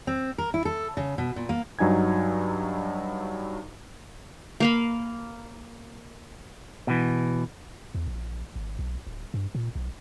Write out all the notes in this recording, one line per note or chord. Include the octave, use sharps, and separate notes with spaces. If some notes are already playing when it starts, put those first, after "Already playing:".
C4
A#4
E4
A4
C#3
B2
A#2
A#3
G2 F#3 D#4 G#5 G#6
A#3 F5 B5
B2 E3
E2
A#1
G#1
B1
D1
G2
A#2
B1